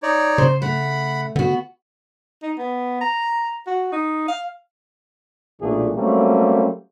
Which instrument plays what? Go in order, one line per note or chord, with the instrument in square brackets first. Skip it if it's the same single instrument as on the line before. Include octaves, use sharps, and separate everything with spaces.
[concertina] D#4 C#5 D5
[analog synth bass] C#3 [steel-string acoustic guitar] C5
[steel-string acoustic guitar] A3 [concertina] F#5 B5
[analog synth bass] D3 [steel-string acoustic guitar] B3 F#4
[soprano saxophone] D#4
B3
A#5
F#4
D#4
F5
[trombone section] B1 A#2 E3 A3 D4 G#4
F#3 G3 A3 A#3 C4 C#4